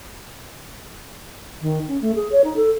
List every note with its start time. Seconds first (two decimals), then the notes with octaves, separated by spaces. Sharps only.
1.61 D#3
1.87 C#4
2.01 A3
2.15 G#4
2.31 C#5
2.43 D#4
2.56 A4